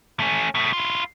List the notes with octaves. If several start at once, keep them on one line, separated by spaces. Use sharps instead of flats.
A3 C#4
B2 A3
E4 F4